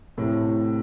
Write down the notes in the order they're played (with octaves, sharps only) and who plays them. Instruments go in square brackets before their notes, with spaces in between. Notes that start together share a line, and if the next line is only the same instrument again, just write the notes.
[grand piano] A2 C3